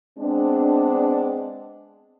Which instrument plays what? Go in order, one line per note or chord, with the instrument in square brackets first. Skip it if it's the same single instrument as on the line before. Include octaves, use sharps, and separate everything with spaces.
[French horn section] G#3 B3 C4 D4